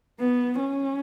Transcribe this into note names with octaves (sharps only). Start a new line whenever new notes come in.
B3
C#4